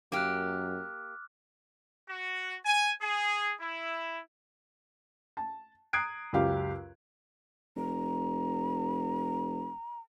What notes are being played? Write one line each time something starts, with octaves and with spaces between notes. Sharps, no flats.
F#2 A#3 G4 D6 F6 F#6
F#4
G#5
G#4
E4
A5
A#5 D#6 F#6 G#6 C7 D7
C#2 F#2 G4 F5
F1 A#5